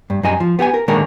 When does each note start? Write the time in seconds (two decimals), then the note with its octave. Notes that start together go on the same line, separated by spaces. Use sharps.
0.10 G2
0.23 F#2 G3 D#5 G#5
0.40 F3
0.59 B3 G4 F#5 G#5
0.74 A#4
0.88 D3 D#3 G#3 A#3 A#4 C#5